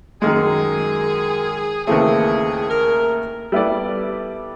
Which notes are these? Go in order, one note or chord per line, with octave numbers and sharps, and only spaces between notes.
F#2 D#3 G#3 G#4
D#2 C#3 E3 A3 C4 G#4
A#4
G3 B3 E4 A4 D5